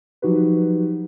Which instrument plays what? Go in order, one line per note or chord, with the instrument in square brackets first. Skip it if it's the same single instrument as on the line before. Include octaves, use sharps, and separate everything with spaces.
[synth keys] F3 F#3 D#4 F#4 G4 B4